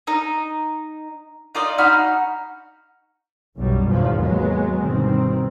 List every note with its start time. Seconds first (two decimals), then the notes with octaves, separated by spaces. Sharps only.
0.07 D#4
1.55 D#4 F4 D5 D#5
1.78 D#4 F#4 B5 F6
3.58 B1 F#2 B2 F#3 G3
3.88 G#1 E2 B2 F3 F#3
4.19 D#2 F#3 G#3 B3
4.81 G1 B2 D#3 C4